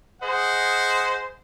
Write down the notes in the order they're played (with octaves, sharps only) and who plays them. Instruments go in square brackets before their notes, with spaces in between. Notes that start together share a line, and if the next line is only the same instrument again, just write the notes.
[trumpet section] G#4 C5 D#5 F#5